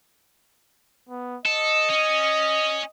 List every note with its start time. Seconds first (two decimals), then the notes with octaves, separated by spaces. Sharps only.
1.09 B3
1.46 A4 D#5
1.89 C#4